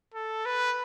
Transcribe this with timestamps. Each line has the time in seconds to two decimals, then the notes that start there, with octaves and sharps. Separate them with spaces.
0.14 A4
0.46 B4